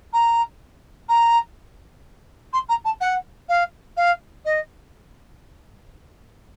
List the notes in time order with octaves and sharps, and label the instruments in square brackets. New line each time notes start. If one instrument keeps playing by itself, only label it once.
[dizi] A#5
A#5
C6
A#5
A5
F#5
F5
F5
D#5